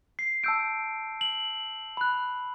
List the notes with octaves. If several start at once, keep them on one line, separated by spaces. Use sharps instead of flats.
C7
A5 E6 G6 D7
F#7
B5 F#6